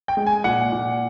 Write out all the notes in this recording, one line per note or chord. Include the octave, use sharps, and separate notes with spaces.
G5
G#3
G#5
A#2 F#5
A#2